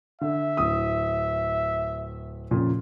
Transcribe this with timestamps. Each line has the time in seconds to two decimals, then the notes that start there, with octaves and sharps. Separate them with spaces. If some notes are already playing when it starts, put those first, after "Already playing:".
0.21 D3 E5
0.57 D1 D#6
2.51 F2 A#2 C#3